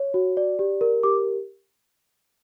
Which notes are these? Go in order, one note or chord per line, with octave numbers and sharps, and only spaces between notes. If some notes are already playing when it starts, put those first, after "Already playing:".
Already playing: C#5
F#4
D5
G4
A#4
G4 D6